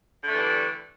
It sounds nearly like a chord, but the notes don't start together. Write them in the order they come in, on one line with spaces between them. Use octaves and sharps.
D3 A3 D4 E3 G3